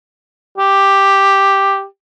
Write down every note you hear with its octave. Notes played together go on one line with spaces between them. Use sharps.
G4